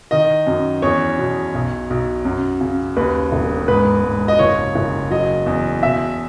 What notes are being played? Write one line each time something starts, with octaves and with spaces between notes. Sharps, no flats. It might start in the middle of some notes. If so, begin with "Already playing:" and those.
D#3 D#5
F#2
E2 C#5
B2
B1
B1
F#2
C#3
D#2 B4
E1
G#2 B4
G#2
D#5
F#1 C#5
F#1
F#3 D#5
E2
B2 E5